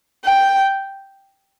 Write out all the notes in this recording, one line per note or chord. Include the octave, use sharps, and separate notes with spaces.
G5